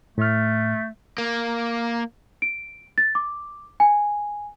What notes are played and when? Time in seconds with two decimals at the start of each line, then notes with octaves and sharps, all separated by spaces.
0.18 A2 A3 F6
1.18 A#3
2.42 D7
2.98 A6
3.15 D6
3.80 G#5